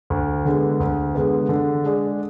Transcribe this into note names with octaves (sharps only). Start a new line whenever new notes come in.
D2
D3 G#3 B3
D2
D3 G#3 B3
D3
G#3 D4 G#4